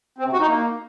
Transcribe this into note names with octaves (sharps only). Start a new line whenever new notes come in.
C4
C3
F#4
D#4
A#3